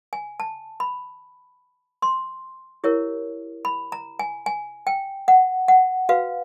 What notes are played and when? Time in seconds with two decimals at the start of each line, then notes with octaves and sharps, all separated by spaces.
0.13 G#5
0.40 A5
0.80 B5
2.02 C6
2.84 E4 G4 A#4 C#5
3.65 B5
3.92 A#5
4.19 G#5
4.46 G#5
4.87 G5
5.28 F#5
5.68 F#5
6.09 F#4 B4 F5